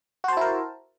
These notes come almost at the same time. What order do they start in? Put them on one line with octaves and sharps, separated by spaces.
F#4 C5 A5 E4 A#4